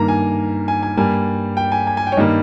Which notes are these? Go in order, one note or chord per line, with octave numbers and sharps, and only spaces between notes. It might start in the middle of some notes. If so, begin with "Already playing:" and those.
Already playing: G2 D#3 A#3 A#5
G#5
G#5
G#5
G2 G3 A#3 G#5
G5
G#5
G#5
G#5
G5
C#5
G2 D#3 G3 A#3 D#5